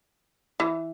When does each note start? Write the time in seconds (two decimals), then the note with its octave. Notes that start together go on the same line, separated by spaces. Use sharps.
0.60 E3